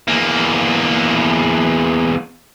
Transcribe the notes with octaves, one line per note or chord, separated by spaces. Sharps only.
E2 A#3